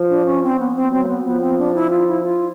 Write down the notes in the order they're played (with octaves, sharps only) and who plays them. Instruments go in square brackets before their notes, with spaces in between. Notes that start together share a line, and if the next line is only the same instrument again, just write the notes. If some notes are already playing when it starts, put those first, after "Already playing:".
Already playing: [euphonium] F3
[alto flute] D4
C#4
C4
B3
C4
[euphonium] F#3 [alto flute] C4
[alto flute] A#3
B3
[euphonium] F3 [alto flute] B3
[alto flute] C4
D4
E4
F4
E4
F4